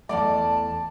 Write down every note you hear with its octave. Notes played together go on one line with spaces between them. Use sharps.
E2 G#2 A3 D5 A5